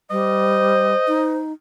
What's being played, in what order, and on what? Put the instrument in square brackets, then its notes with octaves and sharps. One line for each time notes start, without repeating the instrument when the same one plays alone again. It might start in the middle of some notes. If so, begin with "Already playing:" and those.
[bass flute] G3 [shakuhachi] C5 [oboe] D#5
[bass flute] D#4